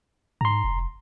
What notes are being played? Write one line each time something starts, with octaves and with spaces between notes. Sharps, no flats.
G#2 A#5 C6
F1